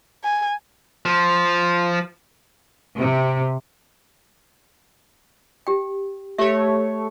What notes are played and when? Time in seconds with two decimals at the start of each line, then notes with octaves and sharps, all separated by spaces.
0.24 G#5
1.05 F3
3.00 C3
5.67 G4 G5
6.38 A3 G4 C#5 E5